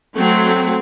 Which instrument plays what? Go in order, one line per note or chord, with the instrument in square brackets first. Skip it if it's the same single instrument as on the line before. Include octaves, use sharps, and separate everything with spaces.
[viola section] F#3 A3 C4